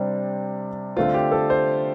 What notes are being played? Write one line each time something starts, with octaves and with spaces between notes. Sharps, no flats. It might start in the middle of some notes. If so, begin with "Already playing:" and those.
Already playing: C3 G3 C4 D4
D3 A3 C4 F4
G4
A4
C5